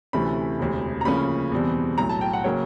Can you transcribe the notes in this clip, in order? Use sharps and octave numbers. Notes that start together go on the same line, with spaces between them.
D2 C3 E3 A3 C#4 B5
E1 D2 C3
A#5
D2 C#3 F3 A#3 C#4 B5
E2 B2 G3 C4
B1 A2 F#3 A#5
A5
G5
F#5
C#3 F#3 A#3 C#5